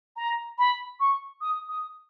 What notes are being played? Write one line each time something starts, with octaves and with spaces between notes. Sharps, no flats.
A#5
B5
C#6
D#6
D#6